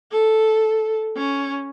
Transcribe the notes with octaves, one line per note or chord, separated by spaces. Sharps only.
A4
C#4